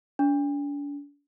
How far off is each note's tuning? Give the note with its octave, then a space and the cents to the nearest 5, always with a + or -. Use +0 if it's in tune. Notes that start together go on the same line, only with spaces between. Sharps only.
D4 -40